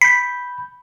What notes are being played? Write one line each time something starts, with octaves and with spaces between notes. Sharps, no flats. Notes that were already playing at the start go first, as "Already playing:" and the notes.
B5 G6 B6